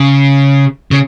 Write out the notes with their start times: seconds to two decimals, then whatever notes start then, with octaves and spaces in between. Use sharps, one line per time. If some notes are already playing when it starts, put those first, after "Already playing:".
Already playing: C#3
0.91 C#3